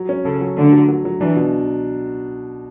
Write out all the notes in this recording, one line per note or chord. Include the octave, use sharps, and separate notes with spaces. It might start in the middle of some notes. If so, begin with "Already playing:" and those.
Already playing: F#3
C#4
C#3 A4
F#3
D3 A3
F#3
F#3
F#3
E3 D4
B2